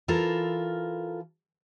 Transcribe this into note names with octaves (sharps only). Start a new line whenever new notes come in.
E3 F4 A4 A#4